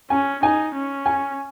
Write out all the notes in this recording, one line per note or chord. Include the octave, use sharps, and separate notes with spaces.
C#4 G#5
D#4 G#5
C#4
G#5